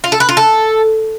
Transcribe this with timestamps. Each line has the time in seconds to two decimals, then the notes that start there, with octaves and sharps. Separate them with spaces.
0.04 F4
0.12 A4
0.20 B4
0.29 F4
0.37 A4